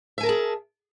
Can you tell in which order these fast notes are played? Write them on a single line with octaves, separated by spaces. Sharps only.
E5 G#5 A#4 A5 G#4